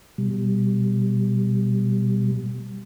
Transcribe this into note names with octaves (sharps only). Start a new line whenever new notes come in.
B2 G3